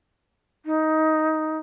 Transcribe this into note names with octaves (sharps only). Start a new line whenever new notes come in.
D#4